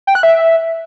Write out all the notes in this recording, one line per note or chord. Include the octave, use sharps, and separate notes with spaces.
G5
F#6
E5